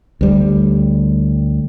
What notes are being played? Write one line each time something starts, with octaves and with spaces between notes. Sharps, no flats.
D2 G3